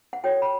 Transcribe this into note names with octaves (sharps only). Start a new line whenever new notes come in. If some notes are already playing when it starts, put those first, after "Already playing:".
F#5
F#4 A4 C#5 G5
B5